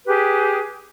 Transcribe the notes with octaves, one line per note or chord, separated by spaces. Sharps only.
G4 G#4 B4